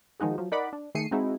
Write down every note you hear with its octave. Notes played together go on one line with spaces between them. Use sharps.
D#3 F3 G#3 D#4 F#4 G#4
F3 F#3
D#4 A#4 D5 F#5 B5 D6
D4
D#3 A3 G#4 C7 C#7 D#7
G#3 C4 D#4 E4 F#4 G#4